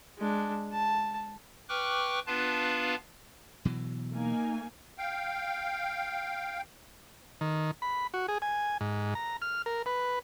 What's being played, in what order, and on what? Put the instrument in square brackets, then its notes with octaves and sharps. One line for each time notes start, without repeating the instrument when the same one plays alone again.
[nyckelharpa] G#3 D4
A5
[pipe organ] B4 G5 C#6 D6 F6 F#6
B3 D4 F4 B4 F5 A5
[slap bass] B2 E3 F#3
[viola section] A#3 D#4 G#5
[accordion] F5 G5
[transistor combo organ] D#3
B5
F#4
G#4
G#5
G#2
A#5
F6
A#4
B4